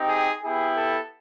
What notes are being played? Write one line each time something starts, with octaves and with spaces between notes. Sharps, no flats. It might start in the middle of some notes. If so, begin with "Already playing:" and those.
Already playing: C4 D#4 G4
G#4
B3 E4 G4 G#4
A4